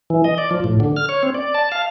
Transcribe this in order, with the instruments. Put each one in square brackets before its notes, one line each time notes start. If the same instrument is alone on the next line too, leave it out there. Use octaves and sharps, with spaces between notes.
[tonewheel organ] E3
D#5
D5
F3
A2
D3
F6
C#5
C4
D5
A5
F5